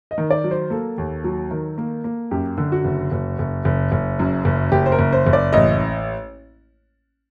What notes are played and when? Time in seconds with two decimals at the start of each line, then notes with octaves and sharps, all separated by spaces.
0.11 D#5
0.18 D#3
0.31 D5
0.44 F#3
0.51 C5
0.70 A#3 A4
0.98 D#2
1.24 F#3
1.51 D#3
1.78 A#3
2.04 A#3
2.31 F#2 G4
2.58 D3
2.72 F#4
2.84 F#1
3.12 F#1
3.39 F#1
3.65 F#1
3.92 F#1
4.19 F#2
4.45 F#1
4.72 F#1 G4
4.86 C5
4.92 A#4
4.98 F#1
5.13 C5
5.26 F#1
5.33 D5
5.53 A1 D#5